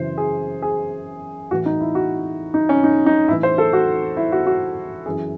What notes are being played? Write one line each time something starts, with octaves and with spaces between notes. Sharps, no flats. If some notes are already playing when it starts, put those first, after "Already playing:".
Already playing: F#2 C#3 E3 C5
G#4
G#4
A2 E3 F#4
D#4
E4
F#4
D#4
C#4
D#4
D#4
A2 E3 E4
C5
A4
F#4
E4
F#4
F#4
F#2 E3 G#4